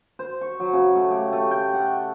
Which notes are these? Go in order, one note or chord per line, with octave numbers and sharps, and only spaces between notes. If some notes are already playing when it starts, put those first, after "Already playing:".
C5
C#6
F#3
C#3
A3
G4
A3
G5
F#5